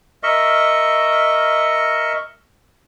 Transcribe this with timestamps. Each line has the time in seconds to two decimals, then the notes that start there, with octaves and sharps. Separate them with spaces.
0.23 A#4 D#5 E5 C#6